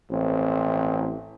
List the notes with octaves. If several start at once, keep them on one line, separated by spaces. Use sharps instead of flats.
A1 C4